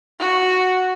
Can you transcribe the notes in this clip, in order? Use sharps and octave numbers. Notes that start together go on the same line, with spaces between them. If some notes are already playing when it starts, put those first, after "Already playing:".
F#4